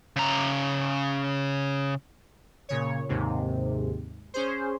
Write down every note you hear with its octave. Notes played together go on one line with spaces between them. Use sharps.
C#3 A#5
A#2 C#3 C#5
D#2 G#2 C3
C#4 G#4 C5